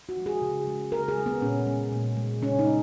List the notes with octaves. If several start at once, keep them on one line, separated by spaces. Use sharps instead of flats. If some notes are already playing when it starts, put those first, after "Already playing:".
F#4
F3 G#3
G#4
C#3
G#3
C#3 A#4
G#4
G#3
B3
A#2 C#4
G#3
A#2
G#3
C#3 C#4
D#4
G#3